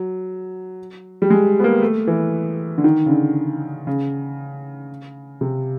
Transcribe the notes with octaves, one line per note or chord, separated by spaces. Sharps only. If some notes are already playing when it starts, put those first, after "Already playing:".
Already playing: F#3
G3
G#3
B3
A#3
A3
E3
D3
D#3
C#3
D3
C#3
C3